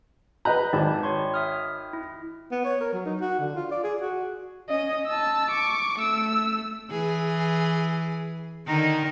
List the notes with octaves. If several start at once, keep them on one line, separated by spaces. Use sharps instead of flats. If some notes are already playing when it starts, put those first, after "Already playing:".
B4 D#5 A#5 B5 F#6 G6
G#1 D5 A5
C#5 C6 C#6
E5 D#6 F6
E4
B3
C#5
A#4
F#3
D#4
F#4
D3
F4
D5
G#4
F#4
C#4 D#5
A5 E6
C#6 D6
A3 E6
E3 G#4
D3 D#3 D#4